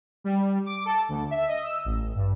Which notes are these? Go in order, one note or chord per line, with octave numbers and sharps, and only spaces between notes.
G3
D6
A4
D2
E5
D#5
E6
A1
G2